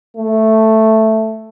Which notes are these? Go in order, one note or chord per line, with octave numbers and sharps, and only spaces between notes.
A3